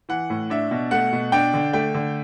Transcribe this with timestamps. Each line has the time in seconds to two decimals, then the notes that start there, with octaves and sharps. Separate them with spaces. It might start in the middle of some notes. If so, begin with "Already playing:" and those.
0.09 E3 F#5
0.30 A2
0.50 D4 E5
0.71 B2
0.91 A3 F#5
1.12 B2
1.32 D4 G5
1.54 D3
1.73 A3 G5
1.95 D3